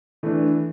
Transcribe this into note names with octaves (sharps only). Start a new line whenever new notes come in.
E3 A3 D4